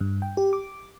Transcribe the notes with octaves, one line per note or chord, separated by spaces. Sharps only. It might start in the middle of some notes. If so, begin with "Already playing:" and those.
G2
G5
G4
D6